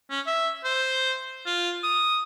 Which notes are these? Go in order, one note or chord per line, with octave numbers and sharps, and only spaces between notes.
C#4
E5
C5
F4
D#6